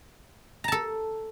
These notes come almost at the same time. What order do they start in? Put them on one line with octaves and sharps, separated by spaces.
A#5 A5 A4